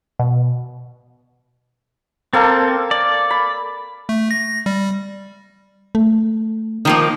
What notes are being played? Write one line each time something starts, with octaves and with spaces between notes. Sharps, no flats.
B2
A#3 C4 A4 A5
D5
B5
A3
A#6
G3
A3
D#3 F3 A#3